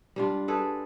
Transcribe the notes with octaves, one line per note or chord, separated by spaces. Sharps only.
G3 D4 F4
G#4 A4 B4